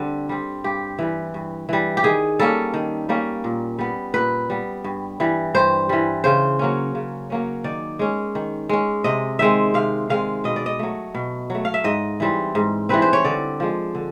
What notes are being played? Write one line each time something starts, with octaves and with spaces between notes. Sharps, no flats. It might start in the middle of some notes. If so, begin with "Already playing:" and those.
Already playing: D3 G3 C4 D4
G3 C4
G2 G4
E3 G3
G2
E3 G3
G4
D#3 G#4
G3 A#3 C#4 A4
D#3
G3 A#3 C#4
A#2
G3 B3
A#2 B4
G3 B3
G2
E3 G3
G2 C5
E3 G3
C#3 C5
F#3 A#3 C#4
C#3
F#3 A#3 C#4
D#3 D5
G#3 C#4
D#3
G#3 C#4
C3 D#5
D#3 G#3 C4 E5
C3 F5
D#3 G#3 C4 F5
B2 D#5
D5
D#5
F#3 A3
B2
F#3 A3
F5
E5
G#2 D#5
E3 G3 C4
G#2
E3 G3 C4 B4
C5
C#5
D3 D5
F3 G#3
D3